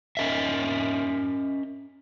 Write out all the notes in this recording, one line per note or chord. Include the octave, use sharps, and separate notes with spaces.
C#4 A#4 D#5 E5